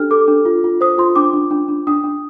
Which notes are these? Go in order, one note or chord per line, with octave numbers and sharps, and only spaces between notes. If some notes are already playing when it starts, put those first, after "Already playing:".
Already playing: D4 G4 A4 F6
A4 D6
D4
F4
F4
C5 D#6
F4 C6
D4 D6
D4
D4
D4
D4 D#6
D4